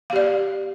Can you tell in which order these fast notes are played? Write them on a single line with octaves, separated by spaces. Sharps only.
F5 G4 D5